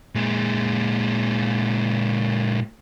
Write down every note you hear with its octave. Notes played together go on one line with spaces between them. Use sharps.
A#2 G#3